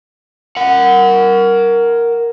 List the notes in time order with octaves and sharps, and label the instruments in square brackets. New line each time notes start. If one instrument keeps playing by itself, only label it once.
[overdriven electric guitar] A#4 F#5